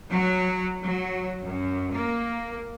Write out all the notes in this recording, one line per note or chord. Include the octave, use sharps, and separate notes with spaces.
F#3
F#3
F#2
A#3